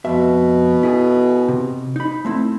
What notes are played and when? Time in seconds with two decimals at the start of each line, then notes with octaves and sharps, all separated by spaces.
0.05 F2 B2 E5
0.83 E4 G#4 A4
1.48 C3
1.96 D#4 B5
2.25 A3 C4 E4